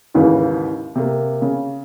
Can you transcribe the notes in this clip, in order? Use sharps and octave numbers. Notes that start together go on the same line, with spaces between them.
D#2 G#2 C#3 E3
C3 A#3
C#3